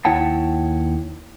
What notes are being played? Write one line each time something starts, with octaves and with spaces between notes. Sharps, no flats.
D#2 E4 C#5 F#5 G5 A5